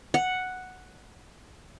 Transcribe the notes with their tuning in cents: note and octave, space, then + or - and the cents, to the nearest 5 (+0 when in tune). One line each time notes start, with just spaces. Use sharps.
F#5 +0